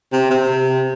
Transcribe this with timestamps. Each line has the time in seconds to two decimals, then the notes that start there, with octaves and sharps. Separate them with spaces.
0.13 C3
0.31 C3